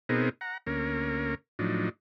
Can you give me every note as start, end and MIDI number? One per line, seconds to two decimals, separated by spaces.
0.09 0.29 47
0.09 0.29 59
0.09 0.29 60
0.09 0.29 63
0.09 0.29 68
0.09 0.29 70
0.41 0.58 78
0.41 0.58 82
0.67 1.35 38
0.67 1.35 58
0.67 1.35 61
0.67 1.35 70
1.59 1.89 45
1.59 1.89 53
1.59 1.89 54
1.59 1.89 62
1.59 1.89 63